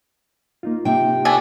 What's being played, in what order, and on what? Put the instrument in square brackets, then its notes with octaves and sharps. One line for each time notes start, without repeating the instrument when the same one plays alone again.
[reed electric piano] A#3 D#4 F4
[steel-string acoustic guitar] C3 G5
[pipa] A3 D4 G#5